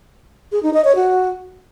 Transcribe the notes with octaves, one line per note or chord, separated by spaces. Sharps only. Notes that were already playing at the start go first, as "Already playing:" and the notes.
G#4
D#4
D#5
C#5
F#4